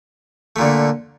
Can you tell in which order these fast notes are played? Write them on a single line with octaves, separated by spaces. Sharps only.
A3 A#2 D3